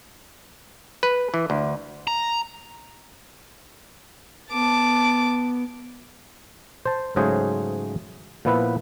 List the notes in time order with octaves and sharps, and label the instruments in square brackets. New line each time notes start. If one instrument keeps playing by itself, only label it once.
[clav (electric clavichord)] B4
E3
D2
[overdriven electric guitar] A#5
[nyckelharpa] B3 [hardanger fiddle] A5 D6
[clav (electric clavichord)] C5 A5
G#2 C#3 F#3 A3 G#4 C5
A#2 F3 B3 E4 B4